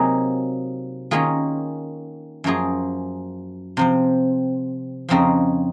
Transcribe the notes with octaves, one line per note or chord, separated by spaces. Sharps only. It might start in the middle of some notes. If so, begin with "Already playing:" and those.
Already playing: C3 F#3 A#3 D#4 G#4
D#3 A#3 C#4 F4 G#4
F#2 F3 A#3 F4 G#4
C3 F3 C4
F2 C#3 F3 C4 D#4